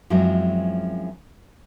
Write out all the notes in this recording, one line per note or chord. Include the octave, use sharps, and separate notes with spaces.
F#2 F3 F#3 G#3 C4 E4